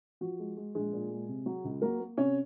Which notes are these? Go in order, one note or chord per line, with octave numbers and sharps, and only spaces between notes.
F3 F#4
G#3
G#3
A#1 G#3 G#4
A#2
G#3
C3
F#3
C#2
F#3 A#3 A#4
A#3
C3 C#4 C#5